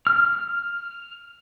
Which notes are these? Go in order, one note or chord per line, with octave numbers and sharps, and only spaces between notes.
F6